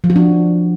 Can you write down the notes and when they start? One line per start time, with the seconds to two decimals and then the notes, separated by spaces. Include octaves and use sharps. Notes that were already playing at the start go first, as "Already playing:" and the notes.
0.04 F3
0.10 F#4
0.16 D4